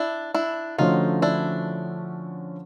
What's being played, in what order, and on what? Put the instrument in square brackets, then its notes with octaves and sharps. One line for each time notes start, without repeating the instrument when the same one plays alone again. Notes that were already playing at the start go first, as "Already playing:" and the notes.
Already playing: [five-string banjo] D4 E4
D4 E4
[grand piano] D3 F3 A3 C#4 F#4 [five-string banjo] D#4 F4
[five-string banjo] D4 E4